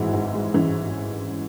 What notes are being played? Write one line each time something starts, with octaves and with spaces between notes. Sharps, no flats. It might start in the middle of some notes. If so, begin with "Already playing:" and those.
Already playing: G#1 G#2 E3 G#3 E4 F#4
G#2
G#3
E3 C#4